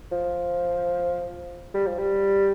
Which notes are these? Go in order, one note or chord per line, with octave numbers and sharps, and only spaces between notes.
F3
G3
F3
G3